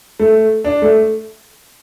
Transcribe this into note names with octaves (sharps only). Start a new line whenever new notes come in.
A3
D4
A3